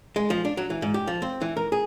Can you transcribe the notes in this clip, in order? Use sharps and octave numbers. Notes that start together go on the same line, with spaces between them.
G#3
F3
D4
F#3
E3
G#2
G4
F3
C4
E3
A#4
G#4